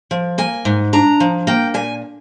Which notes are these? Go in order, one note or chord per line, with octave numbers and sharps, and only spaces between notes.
F3
A#3 G#5
G#2
D4 A#5
F3
A#3 G5
A#2 G#5